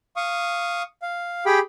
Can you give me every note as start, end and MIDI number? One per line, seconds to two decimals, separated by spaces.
0.16 0.82 77
0.16 0.82 85
0.16 0.82 87
1.02 1.44 77
1.46 1.59 67
1.46 1.59 68
1.46 1.59 79
1.46 1.59 83